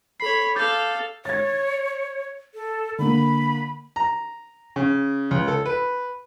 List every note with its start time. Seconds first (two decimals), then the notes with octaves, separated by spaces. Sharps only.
0.20 A4 C#5 B5 C7
0.55 A4 F5 D6 G6 A6
1.25 C#5 G#6 A6
2.54 A4
2.98 D3 A#3 B5
3.96 A#5
4.76 C#3
5.31 C#2
5.48 A4
5.66 B4